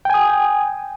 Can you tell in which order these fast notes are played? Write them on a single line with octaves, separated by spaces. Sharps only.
G5 G#5 D#6